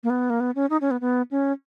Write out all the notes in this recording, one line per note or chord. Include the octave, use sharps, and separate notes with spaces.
A#3
B3
A#3
B3
C#4
D#4
C#4
B3
B3
C#4